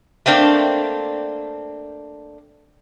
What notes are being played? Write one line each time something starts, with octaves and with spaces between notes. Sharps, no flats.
A3 A#3 C4 D4